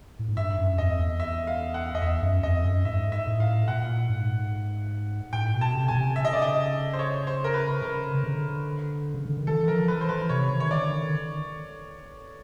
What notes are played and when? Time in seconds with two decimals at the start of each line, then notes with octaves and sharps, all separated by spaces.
0.19 A2
0.28 G#2
0.37 G2 E5
0.58 F#2
0.78 F2 D#5
0.99 E2
1.20 E5
1.47 F5
1.74 F#5
1.95 D#5
2.02 E2 E5
2.22 F#2
2.43 F2 D#5
2.64 F#2
2.84 G#2 E5
3.12 E5
3.27 A2
3.40 F5
3.68 A#2 F#5
4.09 G#2
5.33 A2 G5
5.54 B2
5.61 A5
5.75 C3
5.88 B2 G#5
5.95 C3
6.16 C#3 E5
6.25 D#5
6.33 D5
6.42 D#5
6.93 C5
6.99 C#5
7.27 C5
7.44 A#4
7.54 B4
7.82 C#3 A#4
8.14 C#3
8.24 D3
9.14 C#3
9.25 D3
9.37 D#3
9.47 E3 A4
9.67 F3 A#4
9.88 E3 B4
10.01 C5
10.09 E3 B4
10.29 C3 C#5
10.50 D#3
10.60 C#5
10.71 D3 D5
10.92 D#3